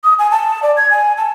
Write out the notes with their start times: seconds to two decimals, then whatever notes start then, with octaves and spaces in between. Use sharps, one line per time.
0.04 D#6
0.19 G#5
0.31 A5
0.63 D5
0.77 G#6
0.91 G#5
1.18 A5